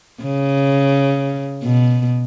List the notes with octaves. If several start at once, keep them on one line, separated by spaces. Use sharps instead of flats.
C#3
B2